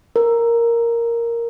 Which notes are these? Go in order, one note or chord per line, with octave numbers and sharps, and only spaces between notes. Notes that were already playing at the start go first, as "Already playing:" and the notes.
A#4